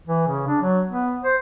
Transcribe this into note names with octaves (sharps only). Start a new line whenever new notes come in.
E3
C#3
D4
F#3
B3
C5